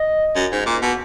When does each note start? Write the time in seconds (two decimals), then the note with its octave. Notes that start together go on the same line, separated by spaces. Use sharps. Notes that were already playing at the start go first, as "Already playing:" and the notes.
Already playing: D#5
0.36 F#2
0.52 G#2
0.66 A#2
0.82 B2